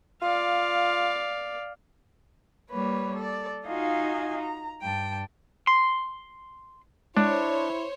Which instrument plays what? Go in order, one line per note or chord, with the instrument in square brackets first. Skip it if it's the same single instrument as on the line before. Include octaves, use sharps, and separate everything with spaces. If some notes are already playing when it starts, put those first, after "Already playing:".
[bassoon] F4 [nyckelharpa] D5 F5
[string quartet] G3 A#3 B4 C#5
A4 D5
D#4 F4 F#4 D#5 F5 G#5
A#5
G2 G5 A5
[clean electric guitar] C6
[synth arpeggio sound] G#3 [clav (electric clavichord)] D4 [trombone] E4 [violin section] C5 C#5